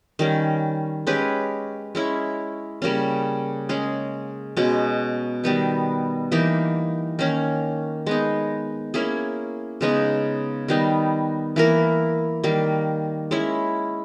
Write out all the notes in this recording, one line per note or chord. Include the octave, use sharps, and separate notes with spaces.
D#3 G3 C#4
G#3 C#4 G4 B4
G#3 C#4 E4
C#3 G3 A#3 C#4
G#3 C#4 G#4
B2 G#3 C#4
D#3 G3 B3 D#4
E3 A#3 D#4 G4
D#3 A#3 C#4
G#3 B3 D#4
A#3 C#4 E4 G#4
C#3 G#3 B3 D#4
D#3 G3 B3 D#4
E3 A#3 E4 A#4
D#3 G3 A#3
G#3 C#4 E4